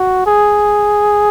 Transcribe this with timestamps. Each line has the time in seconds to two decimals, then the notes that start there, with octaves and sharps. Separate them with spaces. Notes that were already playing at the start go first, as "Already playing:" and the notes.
Already playing: F#4
0.26 G#4